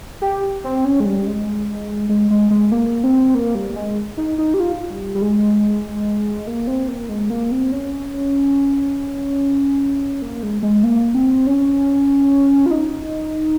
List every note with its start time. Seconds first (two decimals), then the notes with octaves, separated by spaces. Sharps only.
0.22 G4
0.64 C4
0.85 C#4
1.00 G#3
1.06 G3
1.26 G#3
2.09 G#3
2.30 G#3
2.50 G#3
2.72 A#3
3.04 C4
3.35 A#3
3.55 G3
3.76 G#3
4.17 D#4
4.38 D#4
4.54 G4
4.60 F4
4.90 G3
5.15 G3
5.22 G#3
6.47 A#3
6.67 C4
6.88 A#3
7.09 G#3
7.30 A#3
7.51 C4
7.72 C#4
10.22 A#3
10.43 G#3
10.63 G#3
10.83 A#3
11.15 C4
11.47 C#4
12.66 F4
12.71 D#4